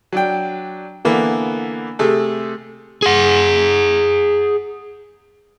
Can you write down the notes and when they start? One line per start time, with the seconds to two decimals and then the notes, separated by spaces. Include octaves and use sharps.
0.12 F#3 D4 G5
1.05 D3 E3 A#3 B3
1.99 C3 A3 G#4 A4
3.02 G#4 F#5